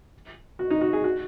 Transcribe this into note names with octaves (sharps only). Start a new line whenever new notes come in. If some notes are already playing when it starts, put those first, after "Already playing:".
F#4
D#4
F#4
G#4
F#4